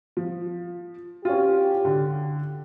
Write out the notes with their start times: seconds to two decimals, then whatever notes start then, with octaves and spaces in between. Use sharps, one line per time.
0.17 F3
1.25 C#4 F4 G4
1.85 D3